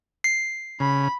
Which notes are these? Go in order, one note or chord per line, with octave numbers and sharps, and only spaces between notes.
C7
C#3 B5